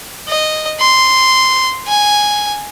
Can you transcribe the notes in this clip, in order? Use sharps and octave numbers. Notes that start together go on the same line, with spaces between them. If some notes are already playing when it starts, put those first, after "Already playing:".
D#5
C6
G#5